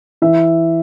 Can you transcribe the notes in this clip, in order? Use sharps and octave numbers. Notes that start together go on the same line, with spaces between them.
E3 E5